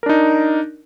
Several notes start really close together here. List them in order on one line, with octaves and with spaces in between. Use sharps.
A#4 D4 D#4